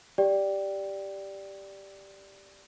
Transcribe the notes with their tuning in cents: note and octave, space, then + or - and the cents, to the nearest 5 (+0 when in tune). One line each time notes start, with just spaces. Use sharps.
G4 +0 D5 +0 G5 +0